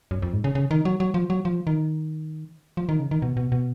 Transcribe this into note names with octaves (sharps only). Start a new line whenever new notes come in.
F#2
F2
G#2
C#3
C#3
D#3
F#3
F#3
F3
F#3
F3
D#3
F3
D#3
C#3
D#3
B2
B2
B2